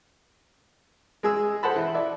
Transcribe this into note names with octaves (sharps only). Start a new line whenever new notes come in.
G#3 G#4 E6
A4 C5 F#5 A5 B5
E3
D5 E5